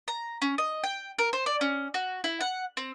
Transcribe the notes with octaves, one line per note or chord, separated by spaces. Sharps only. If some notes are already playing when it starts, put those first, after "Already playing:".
A#5
C#4
D#5
G5
A#4
C5
D5
C#4
F#4
E4
F#5
C4